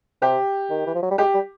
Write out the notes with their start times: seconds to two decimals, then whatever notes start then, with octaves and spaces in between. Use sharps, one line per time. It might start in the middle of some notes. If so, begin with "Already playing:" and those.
0.22 C3 G4
0.70 D#3
0.86 E3
0.95 F3
1.03 F#3
1.11 G3
1.18 G#3 G4
1.34 G3